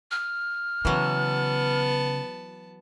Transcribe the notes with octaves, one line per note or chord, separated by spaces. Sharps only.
F6
C#3 E3 F#3 B3 A5